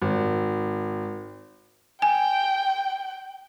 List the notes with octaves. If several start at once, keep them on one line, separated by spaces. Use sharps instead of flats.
G#1
G5 G#5